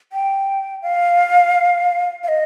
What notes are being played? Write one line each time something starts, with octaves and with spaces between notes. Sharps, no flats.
G5
F5
F5
D#5